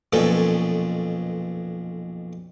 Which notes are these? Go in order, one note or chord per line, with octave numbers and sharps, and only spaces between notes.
B1 F2 A#2 C#4 A4